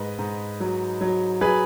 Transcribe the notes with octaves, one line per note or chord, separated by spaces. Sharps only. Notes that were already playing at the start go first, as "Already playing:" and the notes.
Already playing: G#2 B4 D#5
G#2
F#3
F#3
F#3 G#4 B4